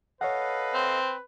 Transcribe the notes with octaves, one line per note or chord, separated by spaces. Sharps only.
A4 B4 C#5 D#5 F5 F#5
C4